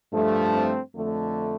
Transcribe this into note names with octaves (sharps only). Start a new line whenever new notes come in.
G2 F3 A3
C4
F2 D3 A3